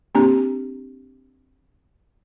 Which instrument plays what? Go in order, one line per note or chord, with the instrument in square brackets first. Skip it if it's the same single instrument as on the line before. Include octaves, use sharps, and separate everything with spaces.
[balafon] A#3 C4 D4 G4 A#5